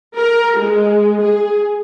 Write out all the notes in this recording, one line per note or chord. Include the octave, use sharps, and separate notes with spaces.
A#4
G#3
G#4